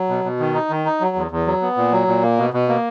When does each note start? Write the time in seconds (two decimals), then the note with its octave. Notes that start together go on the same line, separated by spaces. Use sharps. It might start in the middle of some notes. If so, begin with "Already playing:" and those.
Already playing: F#3
0.09 B2
0.24 B2
0.39 D#3
0.54 D#4
0.70 D#3
0.85 D#4
1.01 F#3
1.16 E2
1.31 E2
1.46 F#3
1.62 B3
1.77 A#2
1.92 F#3
2.07 A#2
2.22 A#3
2.38 B2
2.54 B2
2.68 A#3